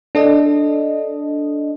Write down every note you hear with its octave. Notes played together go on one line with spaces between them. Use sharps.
D4 A4 D#5